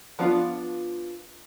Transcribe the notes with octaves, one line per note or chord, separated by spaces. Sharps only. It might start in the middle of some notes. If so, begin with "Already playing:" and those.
F3 B3 D4 F4